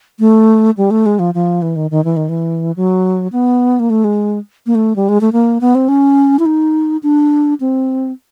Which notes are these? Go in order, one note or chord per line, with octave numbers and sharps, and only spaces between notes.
A3
G3
A3
G#3
F3
F3
E3
D#3
D#3
E3
D#3
E3
F#3
B3
A#3
A3
G#3
A#3
A3
G3
G#3
A3
A#3
B3
C4
C#4
E4
D#4
D4
C4